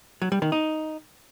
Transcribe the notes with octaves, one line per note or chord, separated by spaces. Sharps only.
F#3
G3
D#3
D#4